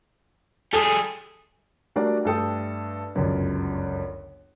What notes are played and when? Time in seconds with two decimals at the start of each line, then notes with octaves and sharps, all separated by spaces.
0.73 G3 G#4 A4
1.96 G3 A3 D4 F#4 A#4 D5
2.25 G2 A3 A4 G5 D#6
3.15 G1 C#2 F#2